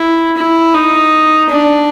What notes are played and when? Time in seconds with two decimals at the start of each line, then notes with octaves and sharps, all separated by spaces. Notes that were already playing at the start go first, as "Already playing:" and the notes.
Already playing: E4
0.37 E4
0.74 D#4
1.49 D4